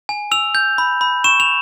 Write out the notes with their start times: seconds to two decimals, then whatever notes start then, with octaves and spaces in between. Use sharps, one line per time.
0.09 G#5
0.31 E6 F7
0.55 G6
0.78 B5
1.01 B5
1.24 C#6 E7
1.40 F7